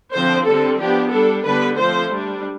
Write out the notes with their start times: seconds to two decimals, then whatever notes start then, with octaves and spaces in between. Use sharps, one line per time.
0.13 D3 F3 C4 C5
0.46 D3 G3 C4 A4
0.79 F3 B3 D4 G4
1.12 G3 D4 A4
1.45 D3 G3 B3 D4 B4
1.78 F3 A3 C4 C5
2.11 G3 D4